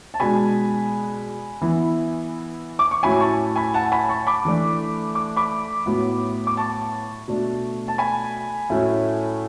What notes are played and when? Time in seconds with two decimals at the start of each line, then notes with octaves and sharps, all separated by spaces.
0.14 A5
0.20 B2 G#3 D4 G#5 B5
1.61 E3 B3 E4
2.79 D6
2.91 C#6
3.03 A2 F#3 C#4 E4 G#5 B5
3.20 A5 C#6
3.56 G#5 B5
3.74 F#5 A5
3.92 G#5 B5
4.09 A5 C#6
4.27 B5 D6
4.45 E3 A3 D4
5.15 D6
5.36 B5 D6
5.86 A2 F#3 B3
6.47 D6
6.57 A5 C#6
7.28 B2 A3 D4
7.88 A5
7.98 G#5 B5
8.70 A2 F#3 A3 C#4 E4